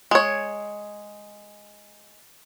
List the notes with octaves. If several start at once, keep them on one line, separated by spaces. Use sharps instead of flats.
G#3 C#5